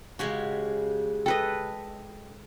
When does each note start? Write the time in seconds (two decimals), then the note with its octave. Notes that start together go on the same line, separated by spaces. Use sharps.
0.19 C#3 G#3 F#4 G4 G#5
1.26 A4 B4 D#5 G5